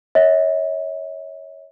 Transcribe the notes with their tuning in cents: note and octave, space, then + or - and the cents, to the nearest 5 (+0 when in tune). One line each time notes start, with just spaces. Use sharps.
C#5 +0 E5 -45